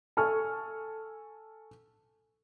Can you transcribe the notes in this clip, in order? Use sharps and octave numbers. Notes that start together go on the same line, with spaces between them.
A4 G#5 C#6 F6